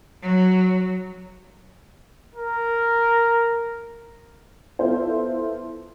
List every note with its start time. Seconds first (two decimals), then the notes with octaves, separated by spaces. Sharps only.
0.22 F#3
2.35 A#4
4.79 B3 E4 F4 A4 C5